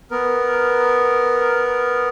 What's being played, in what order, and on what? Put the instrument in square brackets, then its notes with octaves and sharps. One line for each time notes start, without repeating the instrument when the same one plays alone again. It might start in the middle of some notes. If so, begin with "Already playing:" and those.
[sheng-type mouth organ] B3 A#4